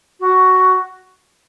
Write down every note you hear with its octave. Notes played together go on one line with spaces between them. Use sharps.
F#4